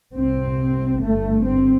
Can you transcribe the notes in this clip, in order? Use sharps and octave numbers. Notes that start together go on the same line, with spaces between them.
C2 C3 C4
G1 G2 A3
C4